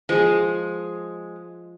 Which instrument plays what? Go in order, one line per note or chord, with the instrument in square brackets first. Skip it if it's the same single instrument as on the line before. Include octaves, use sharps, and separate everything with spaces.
[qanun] F3 G#4 [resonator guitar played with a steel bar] G#3